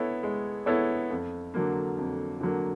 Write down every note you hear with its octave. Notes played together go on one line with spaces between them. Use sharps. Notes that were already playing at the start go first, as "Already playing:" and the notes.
Already playing: B3 E4 A4 C#5
G#3
B3 E4 A4 C#5
F2
D3 F#3 A#3
F2
D3 F#3 A#3